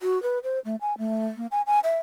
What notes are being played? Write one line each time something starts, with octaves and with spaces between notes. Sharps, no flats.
F#4
B4
C5
A3
G#5
A3
A#3
G#5
G#5
E5